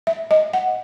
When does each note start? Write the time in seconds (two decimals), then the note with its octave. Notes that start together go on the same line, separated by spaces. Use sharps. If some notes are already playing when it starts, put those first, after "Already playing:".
0.07 E5
0.31 D#5
0.53 F#5